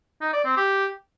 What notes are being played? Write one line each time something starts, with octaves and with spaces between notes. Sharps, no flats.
D#4
D5
C4
G4